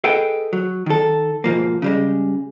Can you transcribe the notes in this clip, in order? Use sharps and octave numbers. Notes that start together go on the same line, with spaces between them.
G#4 A4 B4 D#5 F#5 G5
F#3
D#3 A4
G#2 B2 F3 A#3
C#3 G3 G#3